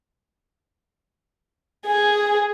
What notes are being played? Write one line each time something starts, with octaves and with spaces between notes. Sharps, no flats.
G#4